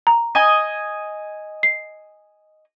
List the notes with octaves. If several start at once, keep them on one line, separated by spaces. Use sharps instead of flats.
A#5
D#5 G#5
C7